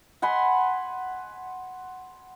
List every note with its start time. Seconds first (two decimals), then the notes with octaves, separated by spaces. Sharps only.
0.22 F#5 G#5 B5 C6